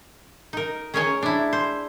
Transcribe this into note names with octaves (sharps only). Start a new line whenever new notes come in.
D#4 A#4
C#4 G#4 A#4 C#5 D#5 G#5
D4 E4
C5